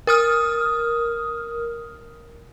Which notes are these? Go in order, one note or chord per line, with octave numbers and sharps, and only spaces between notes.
A#4 D#6 F6